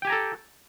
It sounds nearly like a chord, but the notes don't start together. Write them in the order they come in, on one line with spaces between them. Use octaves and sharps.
G5 G4 G#5 A#5 A4